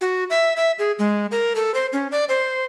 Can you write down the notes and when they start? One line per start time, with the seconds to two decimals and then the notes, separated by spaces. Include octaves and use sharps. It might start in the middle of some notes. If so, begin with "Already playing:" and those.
0.01 F#4
0.30 E5
0.56 E5
0.79 G#4
0.99 G#3
1.31 A#4
1.55 A4
1.74 C5
1.93 C#4
2.12 D5
2.29 C5